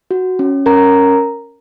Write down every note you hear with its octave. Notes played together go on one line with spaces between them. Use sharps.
F#4
C#4
C#4 A#4 A#5